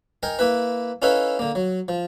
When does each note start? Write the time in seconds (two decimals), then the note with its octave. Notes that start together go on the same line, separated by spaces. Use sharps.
0.23 D#4 A#4 G5 G#5
0.39 A#3 E4 B4
1.02 C#4 D#4 E4 A4 B4 F5
1.39 D3 A#3
1.55 F#3
1.88 F3